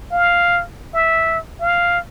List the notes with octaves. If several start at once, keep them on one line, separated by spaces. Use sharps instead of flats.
F5
E5
F5